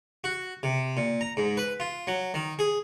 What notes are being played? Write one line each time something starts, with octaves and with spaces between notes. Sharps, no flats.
F#4
C3
A#2
A#5
G#2
B4
F4
F#3
D#3
G#4